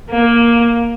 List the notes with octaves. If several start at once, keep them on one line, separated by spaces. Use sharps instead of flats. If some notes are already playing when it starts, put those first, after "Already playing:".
A#3